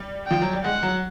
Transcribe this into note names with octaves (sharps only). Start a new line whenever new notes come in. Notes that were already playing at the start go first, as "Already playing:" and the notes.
Already playing: G3
F3 G5
F#3
G3
G#3 F#5
F#3